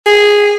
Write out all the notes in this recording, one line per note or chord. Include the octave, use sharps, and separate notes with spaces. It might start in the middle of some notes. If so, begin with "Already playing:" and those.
G#4